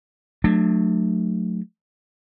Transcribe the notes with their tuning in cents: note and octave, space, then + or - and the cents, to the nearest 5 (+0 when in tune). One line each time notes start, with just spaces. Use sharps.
F#3 -20 A3 -5 D4 +30